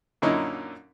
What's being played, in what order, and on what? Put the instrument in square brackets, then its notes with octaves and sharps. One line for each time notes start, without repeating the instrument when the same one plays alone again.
[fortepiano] F#2 A#2 D3 C#4 D#4 E4